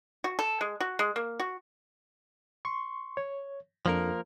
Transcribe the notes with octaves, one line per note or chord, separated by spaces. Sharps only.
F#4
A4
G#3
F#4
G#3
A#3
F#4
C6 C#6
C#5
F2 F3 A#3 D4 A4 A#4